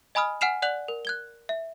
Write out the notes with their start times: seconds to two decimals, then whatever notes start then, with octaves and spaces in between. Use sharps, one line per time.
0.15 D#5 G#5 B5 D#6 F6
0.41 F#5 G#5 F6 C7 E7 F7
0.62 D5 F#5 F#6 F7 F#7
0.88 A#4
1.05 F#6 G#6 G7
1.49 E5